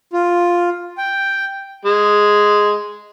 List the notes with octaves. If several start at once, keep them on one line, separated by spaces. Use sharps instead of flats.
F4
G5
G#3